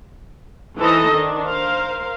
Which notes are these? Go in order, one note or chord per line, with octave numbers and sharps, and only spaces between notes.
E3 D#4 A4 C5 D#5
D#3 D4
A#4 C5 F5